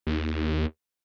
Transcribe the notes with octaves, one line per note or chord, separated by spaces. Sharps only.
D#2